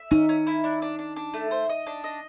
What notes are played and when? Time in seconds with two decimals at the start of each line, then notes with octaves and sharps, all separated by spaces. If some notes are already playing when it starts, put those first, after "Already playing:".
Already playing: E5
0.11 C#4 D#4
0.29 C#4
0.47 E4
0.64 D4
0.82 D4
0.99 D4
1.16 D4
1.34 A3
1.51 C5
1.69 D#5
1.87 D4
2.04 D#5